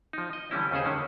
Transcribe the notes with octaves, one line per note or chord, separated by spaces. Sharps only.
F3 D#4
D#5
D3 E3 G3 C#4 E4
D#2 C#3 C#4 G#4 C5
D3 D#3 C#4